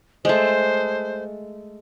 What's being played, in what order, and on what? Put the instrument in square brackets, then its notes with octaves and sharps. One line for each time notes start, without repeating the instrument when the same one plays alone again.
[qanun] G#3 A3 [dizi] C5